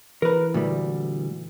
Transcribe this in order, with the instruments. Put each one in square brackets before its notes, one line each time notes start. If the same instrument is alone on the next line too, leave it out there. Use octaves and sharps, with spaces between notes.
[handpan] E3 [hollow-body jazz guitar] A#4 B4
[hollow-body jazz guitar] D2 G3 [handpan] A#2